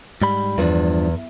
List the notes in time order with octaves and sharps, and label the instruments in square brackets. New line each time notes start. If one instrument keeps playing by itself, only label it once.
[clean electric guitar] G#2 G3 B5
[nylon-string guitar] E2 [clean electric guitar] G2 F3 D4